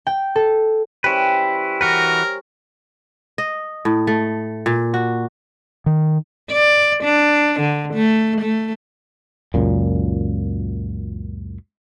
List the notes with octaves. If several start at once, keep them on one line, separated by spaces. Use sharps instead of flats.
G5
A4
G3 C#4 E4 B4 C5
E3 F#4 A#4 B4
D#5
A2
A3
A#2
F#4
D#3
D5
D4
D3
A3
A3
C#2 F#2 A#2